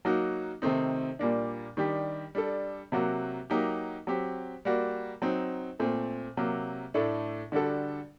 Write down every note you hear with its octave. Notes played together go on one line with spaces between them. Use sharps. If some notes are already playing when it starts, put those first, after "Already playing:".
F#3 A#3 D#4 F#4
C3 D#3 A3 C4 D#4
A#2 G3 A#3 D4
D#3 G3 D4 G4
G3 D4 A4
C3 F#3 A#3 F#4
F#3 A#3 D#4 G4
F#3 C4 G4
G3 A#3 F#4
F#3 C4 D#4
A#2 A3 C4
C3 F#3 A#3
A2 A3 D4 A4
D3 G3 D4 F#4 A4